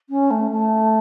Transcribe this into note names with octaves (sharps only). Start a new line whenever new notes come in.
C#4
A3
A3